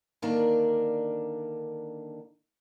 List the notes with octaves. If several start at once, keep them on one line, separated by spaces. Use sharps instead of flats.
D3 D#3 A#3 D4 A#4 D5